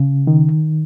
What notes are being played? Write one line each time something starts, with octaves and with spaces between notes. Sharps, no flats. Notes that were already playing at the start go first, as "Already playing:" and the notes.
Already playing: C#3
D#3